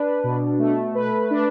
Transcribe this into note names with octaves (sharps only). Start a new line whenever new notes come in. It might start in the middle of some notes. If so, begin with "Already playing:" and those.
Already playing: D4 B4
B2
A3
B4
D4